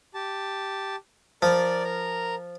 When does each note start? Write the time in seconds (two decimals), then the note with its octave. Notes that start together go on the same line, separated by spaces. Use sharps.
0.14 G4 A5
1.42 F3 A#4 D5
1.84 A#4 A#5